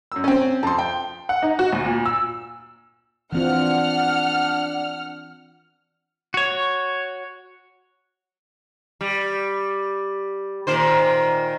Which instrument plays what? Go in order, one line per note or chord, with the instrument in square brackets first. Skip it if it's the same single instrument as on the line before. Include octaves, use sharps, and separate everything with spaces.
[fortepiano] F#2 E6
C4 C#4
[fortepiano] F2 [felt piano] A5 C6
[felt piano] G5
[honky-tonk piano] F#5
D#4
F#4
D2
A#2
E6
[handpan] E3 C4 F4 [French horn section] D4 [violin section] F#5 F6
[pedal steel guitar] F#4 C#5
[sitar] G3
A#2 D#3 C5